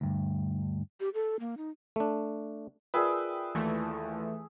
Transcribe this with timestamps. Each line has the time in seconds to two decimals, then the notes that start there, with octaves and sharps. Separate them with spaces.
0.01 D2 G2
1.00 G4
1.14 A4
1.40 A#3
1.57 D#4
1.96 A3 D4
2.94 F4 G#4 A#4 B4 D5 E5 G5
3.55 D#2 E3 A3